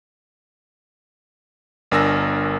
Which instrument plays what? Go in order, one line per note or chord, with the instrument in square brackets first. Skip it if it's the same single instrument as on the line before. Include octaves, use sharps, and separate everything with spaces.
[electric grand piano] G1 D4 A#4 G#5 E6 A#6